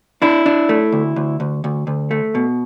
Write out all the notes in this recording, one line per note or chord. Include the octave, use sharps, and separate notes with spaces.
D4 E4
D4
A3
D2
D2
D2
D2
D2
A3
B2